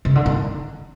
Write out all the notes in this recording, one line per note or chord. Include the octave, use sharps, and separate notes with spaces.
C#3
D3
D#3